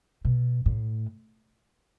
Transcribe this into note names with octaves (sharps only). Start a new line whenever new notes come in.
B2
A2